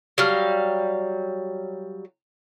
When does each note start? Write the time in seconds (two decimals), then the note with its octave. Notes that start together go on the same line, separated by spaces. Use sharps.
0.18 F#3 G3 F5